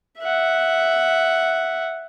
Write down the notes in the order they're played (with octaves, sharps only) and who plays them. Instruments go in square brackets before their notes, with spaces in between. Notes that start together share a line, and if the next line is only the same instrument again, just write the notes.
[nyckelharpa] E5 F#5